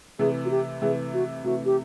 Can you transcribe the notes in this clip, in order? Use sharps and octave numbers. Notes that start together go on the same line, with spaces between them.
C3 E3 A3 G#4
F#4
G4
C3 E3 A3 G#4
F#4
C3 E3 A3 F#4
G4